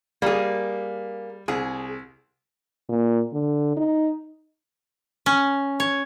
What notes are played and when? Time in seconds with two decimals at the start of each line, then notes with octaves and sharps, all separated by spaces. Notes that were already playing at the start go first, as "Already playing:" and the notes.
0.22 G3 A#3 G#4
1.48 C2 G#4
2.89 A#2
3.32 D3
3.77 D#4
5.26 C#4
5.80 C#5